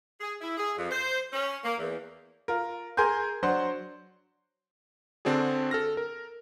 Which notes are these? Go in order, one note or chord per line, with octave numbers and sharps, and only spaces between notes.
G#4
E4
G#4
F2
C5
C#4
A#3
E2
F4 A#4
G#4 A#4 G#5 C6 G6
F#3 D4 C5 F#5 C6
D3 C4 D4 F#4 G#4
A4 F6 A#6
A#4